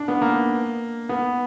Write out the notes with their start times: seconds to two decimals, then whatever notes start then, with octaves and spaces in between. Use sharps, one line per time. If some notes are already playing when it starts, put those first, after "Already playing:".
Already playing: D4
0.08 B3
0.22 A#3
1.09 B3